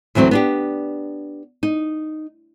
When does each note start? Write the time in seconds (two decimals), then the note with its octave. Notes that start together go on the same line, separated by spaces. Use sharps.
0.15 D2 E3 F#3 C4 F#4
0.31 B3 D4 G4
1.63 D#4